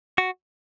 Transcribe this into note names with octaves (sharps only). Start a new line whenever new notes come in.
F#4